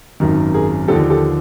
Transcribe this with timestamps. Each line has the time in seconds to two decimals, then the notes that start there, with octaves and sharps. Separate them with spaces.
0.20 G#1 F#2 D#3
0.54 G#4 A#4
0.88 D#2 D3 F3 G4 A4
1.10 G4 A4